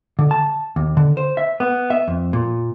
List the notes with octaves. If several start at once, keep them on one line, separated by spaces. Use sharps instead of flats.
D3
A5
D#2
D3
C5
E5
B3
E5
F2
A#2